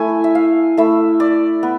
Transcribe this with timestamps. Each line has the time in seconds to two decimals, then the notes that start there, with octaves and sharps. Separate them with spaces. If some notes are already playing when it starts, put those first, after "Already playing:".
Already playing: A3 E4 G#5
0.24 E5
0.35 F5
0.77 A3 E4 E5
1.20 D5
1.63 B3